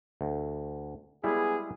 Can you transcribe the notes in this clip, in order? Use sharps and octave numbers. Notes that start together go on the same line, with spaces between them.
D2
G3 G#3 B3 E4 G#4